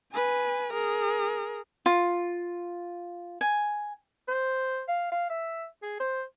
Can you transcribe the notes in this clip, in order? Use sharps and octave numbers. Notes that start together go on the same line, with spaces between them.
B4 G#5
G#4 A#4
F4
G#5
C5
F5
F5
E5
G#4
C5